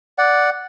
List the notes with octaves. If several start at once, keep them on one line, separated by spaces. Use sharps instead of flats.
D5 F#5